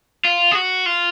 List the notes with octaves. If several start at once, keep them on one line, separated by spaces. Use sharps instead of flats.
F4
G#4
F#4
F4